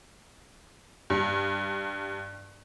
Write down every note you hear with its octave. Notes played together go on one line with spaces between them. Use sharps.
G2